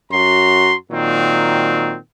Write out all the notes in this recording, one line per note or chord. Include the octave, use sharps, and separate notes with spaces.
F#2 F#4 A#5 C6
A#2 D#3 F#3 C4